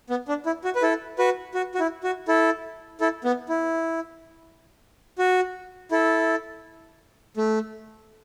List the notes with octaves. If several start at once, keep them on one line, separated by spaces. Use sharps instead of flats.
B3
D4
E4
F#4
B4
E4 A4
F#4 B4
F#4
F#4
E4
F#4
E4 A4
E4 A4
B3
E4
F#4
E4 A4
A3